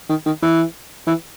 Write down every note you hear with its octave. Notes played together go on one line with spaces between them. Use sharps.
D#3
D#3
E3
E3